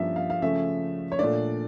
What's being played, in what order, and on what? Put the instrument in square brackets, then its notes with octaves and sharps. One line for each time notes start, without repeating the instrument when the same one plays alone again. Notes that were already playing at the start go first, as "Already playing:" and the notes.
Already playing: [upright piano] G2 F3 A#3 C#4 E5
F5
F5
C#3 F3 A3 C#4 E5
C#5
A#2 A3 D4 D5